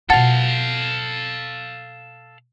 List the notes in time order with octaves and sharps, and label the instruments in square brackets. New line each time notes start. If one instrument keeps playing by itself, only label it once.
[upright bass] B2 F4 [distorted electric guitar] A4 F5 [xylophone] F#5 A5 A6